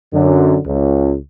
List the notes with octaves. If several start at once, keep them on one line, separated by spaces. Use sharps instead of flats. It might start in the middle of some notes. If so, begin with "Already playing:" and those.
F#2 D3
C#2